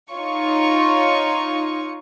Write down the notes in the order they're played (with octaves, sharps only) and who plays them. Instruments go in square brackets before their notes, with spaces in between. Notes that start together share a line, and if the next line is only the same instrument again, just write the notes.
[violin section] D#4 F4 C#5 C#6